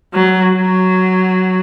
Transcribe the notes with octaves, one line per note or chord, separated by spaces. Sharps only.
F#3
F#3